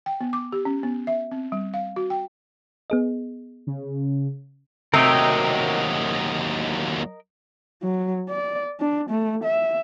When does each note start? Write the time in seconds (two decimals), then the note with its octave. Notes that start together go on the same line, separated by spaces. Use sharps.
0.06 G5
0.21 B3
0.33 D6
0.52 G4
0.65 C#4
0.83 B3
1.07 E5
1.31 C4
1.52 G3
1.74 F5
1.96 F#4
2.10 G5
2.90 B3 G#4 D#5
3.67 C#3
4.94 D#2 C3 F#3 A3 A#4 D#5 G5
7.83 F#3
8.29 D5
8.80 D4
9.10 A3
9.44 E5